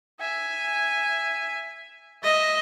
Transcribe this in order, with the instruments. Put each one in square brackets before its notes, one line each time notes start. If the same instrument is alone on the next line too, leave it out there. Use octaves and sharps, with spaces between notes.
[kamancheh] E5 G#5
[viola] D#5 [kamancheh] E5